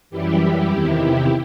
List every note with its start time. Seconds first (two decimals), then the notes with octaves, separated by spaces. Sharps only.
0.10 F#2 E3 G3 E4 G4
0.68 E2 C3 D#3